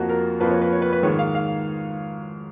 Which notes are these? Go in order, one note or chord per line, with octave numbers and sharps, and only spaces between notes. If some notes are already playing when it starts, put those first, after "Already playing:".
Already playing: F2 F3 A#3 F#4
A#4
F2 F3 A#3 B4
C#5
B4
C#5
B4
B4
G#2 D#3 G#3 C#5
F5
F5